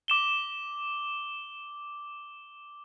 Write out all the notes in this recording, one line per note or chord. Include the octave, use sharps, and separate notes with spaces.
D6 E7 G7